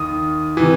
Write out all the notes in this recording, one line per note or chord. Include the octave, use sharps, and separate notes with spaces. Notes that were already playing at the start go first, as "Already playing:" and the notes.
Already playing: D#2 D#3 D#6
C3 E3